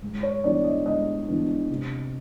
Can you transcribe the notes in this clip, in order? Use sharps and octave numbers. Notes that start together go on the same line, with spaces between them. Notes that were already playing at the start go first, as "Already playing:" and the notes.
G#2
C#5
E3 G3 B3 D4 D5
D#5
G#2 D#5
E3 G3 B3 D4
C3